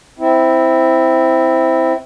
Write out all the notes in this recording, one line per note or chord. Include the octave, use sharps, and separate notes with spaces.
C4 E4